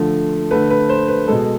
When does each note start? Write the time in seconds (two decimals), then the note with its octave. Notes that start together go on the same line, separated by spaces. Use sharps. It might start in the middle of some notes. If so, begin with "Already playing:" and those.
Already playing: D3 F3 A3
0.51 D3 A3 B4
0.70 B4
0.89 C5
1.08 B4
1.28 B2 G#3 A4